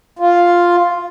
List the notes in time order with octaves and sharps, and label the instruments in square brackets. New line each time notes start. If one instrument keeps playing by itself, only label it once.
[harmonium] F4